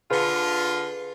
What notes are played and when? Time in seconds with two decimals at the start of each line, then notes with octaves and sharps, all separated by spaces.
0.11 D3 F4 G#4 B4